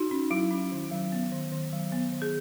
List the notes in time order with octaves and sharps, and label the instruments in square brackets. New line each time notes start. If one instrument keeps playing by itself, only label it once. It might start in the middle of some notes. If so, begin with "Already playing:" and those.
Already playing: [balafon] D#4 F#4
C#4
F#3 E4
C#4
D#3
F#3
B3
D#3
D#3
F#3
B3
D#3
G#4